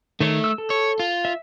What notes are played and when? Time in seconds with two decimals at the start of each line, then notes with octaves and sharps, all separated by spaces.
0.20 D#3 A3 C#5
0.44 E6
0.58 A4
0.70 C#5
0.99 F4
1.25 E5